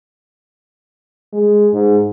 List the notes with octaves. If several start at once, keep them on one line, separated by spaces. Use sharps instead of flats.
G#3
G#2